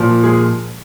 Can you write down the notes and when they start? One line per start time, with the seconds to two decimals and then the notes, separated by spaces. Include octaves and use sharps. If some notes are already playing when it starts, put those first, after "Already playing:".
Already playing: A#2 F3
0.24 G#3 G#4